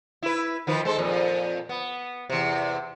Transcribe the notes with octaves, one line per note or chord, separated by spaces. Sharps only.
E4 B4
D#3 F3 B4
G#3 A4 C5
F2 A#2
B3
E2 C3